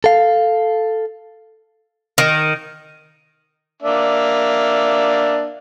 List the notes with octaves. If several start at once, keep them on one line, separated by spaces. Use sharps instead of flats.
A4 F5
D#3
A#3 D4 E5